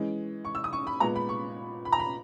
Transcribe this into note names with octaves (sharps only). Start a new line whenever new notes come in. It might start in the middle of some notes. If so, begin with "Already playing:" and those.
Already playing: E3 G#3 C#4
C#6
E6
D#6
C#6
B5
A#2 G#3 B3 A#5
B5
C#6
B5
A#5
B5